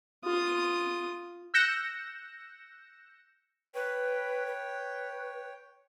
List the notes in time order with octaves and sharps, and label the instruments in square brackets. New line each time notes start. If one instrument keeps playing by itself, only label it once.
[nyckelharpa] F4 D#6
[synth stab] E6 F#6 G6 A#6 C#7 E7
[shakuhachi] B4 [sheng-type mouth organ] C#5 G5
[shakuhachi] B4